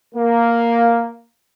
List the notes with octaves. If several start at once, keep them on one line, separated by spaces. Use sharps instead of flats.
A#3